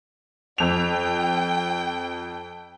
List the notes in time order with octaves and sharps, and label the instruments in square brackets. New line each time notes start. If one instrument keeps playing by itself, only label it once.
[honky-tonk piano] F2 F7 [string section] G5